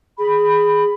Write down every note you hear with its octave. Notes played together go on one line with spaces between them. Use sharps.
G#4 B5